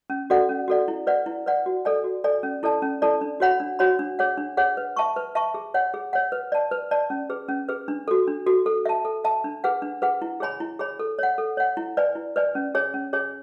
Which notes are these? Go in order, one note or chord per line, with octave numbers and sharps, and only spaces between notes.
C#4
F#4 A4 D5 F#5
C#4
F#4 A4 D5 F#5
E4
B4 D5 F#5
E4
B4 D5 F#5
F#4
A4 D5 G#5
F#4
A4 D5 G#5
C#4
E4 A4 D5 A5
C#4
E4 A4 D5 A5
D4
F#4 C#5 F#5 B5
D4
F#4 C#5 F#5 B5
D4
G#4 C#5 F#5
D4
G#4 C#5 F#5
B4
E5 A5 C#6
B4
E5 A5 C#6
G#4
C#5 F#5
G#4
C#5 F#5
B4
D5 A5
B4
D5 A5
C#4
G#4 B4
C#4
G#4 B4
D4
F#4 A4
D4
F#4 A4
A4
E5 A5
A4
E5 A5
D4
G#4 B4 F#5
D4
G#4 B4 F#5
E4
G#4 C#5 G#5 B5
E4
G#4 C#5 G#5 B5
A4
C#5 F#5
A4
C#5 F#5
E4
B4 D5 G#5
E4
B4 D5 G#5
C#4
G#4 C#5 G#5
C#4
G#4 C#5 G#5